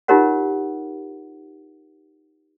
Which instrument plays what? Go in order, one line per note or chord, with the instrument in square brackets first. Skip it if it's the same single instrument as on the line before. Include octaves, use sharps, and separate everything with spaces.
[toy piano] D#4 F4 G4 A#4 C#5 F#5